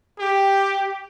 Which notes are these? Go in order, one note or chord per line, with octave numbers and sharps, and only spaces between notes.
G4